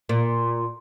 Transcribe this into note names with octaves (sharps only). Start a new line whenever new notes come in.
A#2